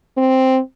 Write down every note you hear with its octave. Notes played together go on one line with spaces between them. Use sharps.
C4